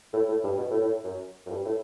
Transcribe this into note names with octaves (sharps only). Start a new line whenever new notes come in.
A2
A2
G2
B2
A2
A2
F#2
F#2
G2
A2